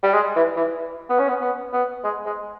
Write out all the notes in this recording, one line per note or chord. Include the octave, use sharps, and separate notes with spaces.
G3
G#3
E3
E3
B3
C#4
B3
B3
B3
G#3
G#3